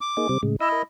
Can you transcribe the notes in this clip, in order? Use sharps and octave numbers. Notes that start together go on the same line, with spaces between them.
D6
A#3 D#4 G#4
C3 G3 C4
A2 C#3 G#3
E4 D#5 E5 E6
A#4